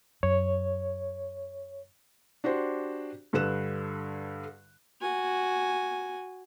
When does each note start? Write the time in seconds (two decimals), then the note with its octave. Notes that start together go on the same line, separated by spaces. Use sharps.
0.23 F#2 C#5
2.44 D4 F#4 G4 C5
3.33 G2 D3 B4 F#6 E7
5.01 F#4 G#5